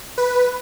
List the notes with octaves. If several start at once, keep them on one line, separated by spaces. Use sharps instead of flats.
B4